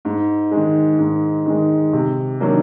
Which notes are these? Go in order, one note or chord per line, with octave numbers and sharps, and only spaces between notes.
G#2
D#3 G#3
G#2
D#3 G#3
C3
D#3 F#3 A#3 D4